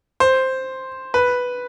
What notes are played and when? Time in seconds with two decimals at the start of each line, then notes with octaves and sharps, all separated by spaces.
0.20 C5
1.14 B4